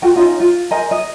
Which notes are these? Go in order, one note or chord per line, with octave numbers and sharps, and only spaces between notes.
F4 F#4 A4 G5
C#4 D#4 F4 D#5
F4
A#4 C5 D#5 G#5
D#5